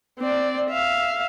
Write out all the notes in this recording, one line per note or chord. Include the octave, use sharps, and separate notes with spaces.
C4 D5
E5 F5